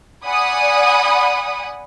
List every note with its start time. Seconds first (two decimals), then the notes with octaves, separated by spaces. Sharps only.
0.25 D5 F#5 G#5 B5 D#6